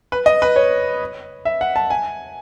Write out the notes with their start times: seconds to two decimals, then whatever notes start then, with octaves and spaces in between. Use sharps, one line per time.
0.12 B4
0.26 D#5
0.42 B4
0.56 C#5
1.45 E5
1.61 F#5
1.76 A5
1.90 G#5